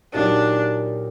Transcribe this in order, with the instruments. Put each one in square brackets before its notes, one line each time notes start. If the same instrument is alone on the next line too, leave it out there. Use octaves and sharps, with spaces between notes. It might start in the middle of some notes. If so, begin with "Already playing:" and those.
[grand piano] A#2 F#3 A#3 D#4 G4 [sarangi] D4